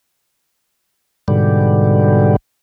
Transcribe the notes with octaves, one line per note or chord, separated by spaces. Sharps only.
G#2 B2 D3 G3